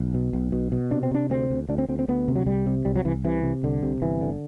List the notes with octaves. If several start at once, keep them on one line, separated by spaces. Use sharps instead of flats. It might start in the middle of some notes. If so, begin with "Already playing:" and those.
Already playing: B1
B2
B1
B2
B2
C3 D4
C4
C3 D4
D2 C4
D2
D2 D4
C4
D2 C4
C4
D2 B3
C3
F#3
C2 G3
C3
C2 G3
F#3
C2 E3
C3 E3
C3
C2 D3
C3
G1 E3
D3